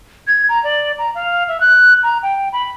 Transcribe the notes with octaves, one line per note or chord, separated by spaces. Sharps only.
G#6
A#5
D5
A#5
F5
E5
F#6
A#5
G5
B5